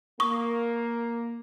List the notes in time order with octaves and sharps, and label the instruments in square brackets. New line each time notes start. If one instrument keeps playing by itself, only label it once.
[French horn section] A#3 [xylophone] C#6 D#6